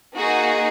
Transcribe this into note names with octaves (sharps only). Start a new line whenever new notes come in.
A#3 D#4 F#4 G#4 F#5